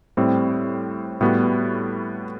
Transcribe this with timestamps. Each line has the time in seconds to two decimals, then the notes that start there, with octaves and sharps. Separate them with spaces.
0.17 A2 G3 C4
1.21 A2 G3 B3 F#4